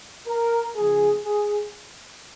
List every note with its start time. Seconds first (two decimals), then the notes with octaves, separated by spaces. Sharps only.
0.27 A#4
0.75 C#3 F3 A#3 G#4
1.24 G#4